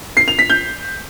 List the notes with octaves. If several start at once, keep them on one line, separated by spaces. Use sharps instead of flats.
C7
F7
B6
G6